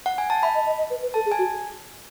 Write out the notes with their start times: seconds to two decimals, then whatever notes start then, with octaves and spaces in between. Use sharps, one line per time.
0.06 F#5
0.18 G#5
0.30 A5
0.43 E5 B5
0.55 D#5
0.66 D#5
0.78 D#5
0.90 B4
1.03 B4
1.14 A4 A5
1.26 G#4
1.32 G#5
1.38 F#4